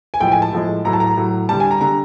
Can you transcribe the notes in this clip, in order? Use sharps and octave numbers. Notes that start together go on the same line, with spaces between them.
G#5
A2 F3 G#3 G5
G#5
A5
A2 F3 G#3
A2 F#3 A#5
A5
A#5
A2 F#3
D3 G3 A5
G#5
A#5
D3 G3 A#5